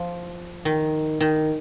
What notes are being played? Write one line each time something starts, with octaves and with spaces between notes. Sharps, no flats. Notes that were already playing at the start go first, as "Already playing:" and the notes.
Already playing: F3
D#3
D#3